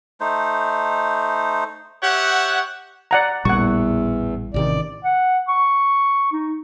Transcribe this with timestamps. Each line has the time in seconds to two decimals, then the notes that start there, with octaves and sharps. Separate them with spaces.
0.21 A3 D#4 C5
2.02 G4 C#5 E5 F#5
3.11 D5 F#5 A#5
3.45 A1 E2 A#2 G3 F#5 C#6
4.54 A1 C3 D#3 D5
5.04 F#5
5.48 C#6
6.32 D#4